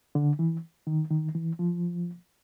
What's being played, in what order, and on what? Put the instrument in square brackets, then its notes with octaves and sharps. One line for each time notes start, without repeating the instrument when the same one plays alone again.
[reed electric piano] D3
E3
D#3
D#3
E3
F3